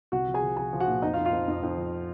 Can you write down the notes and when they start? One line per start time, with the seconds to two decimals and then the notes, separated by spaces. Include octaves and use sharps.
0.12 C2 F#4 F#5
0.27 F3
0.34 G#4 G#5
0.43 F3
0.57 F3 G#4 G#5
0.73 F3
0.80 F#4 F#5
0.88 A#2
1.02 F2 D#4 D#5
1.13 F4 F5
1.17 F2
1.25 F4 F5
1.33 F2
1.48 F2
1.63 F2
1.77 F3